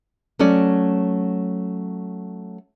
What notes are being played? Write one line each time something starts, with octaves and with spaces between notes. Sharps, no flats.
F#3 A3 C#4 D5